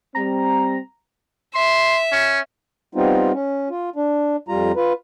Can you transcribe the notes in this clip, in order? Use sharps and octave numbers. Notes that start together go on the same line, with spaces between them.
G3 C4 A#5
E5 C6
C#4
G3 B3 C4 D#4 F4
C#4
F4
D4
F2 G3 F4 A#5
F4 B4